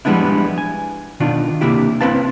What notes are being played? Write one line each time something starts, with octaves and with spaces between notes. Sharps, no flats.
F3 G3 G#3 B3 D4 E4
G#5
B2 D#3 D4 F4
C3 A#3 D4 E4 G4
C4 E4 B4 F5 A5